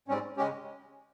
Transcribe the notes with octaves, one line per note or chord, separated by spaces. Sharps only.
G#2 G3 C4 C#4
C#3 G#3 C#4 G4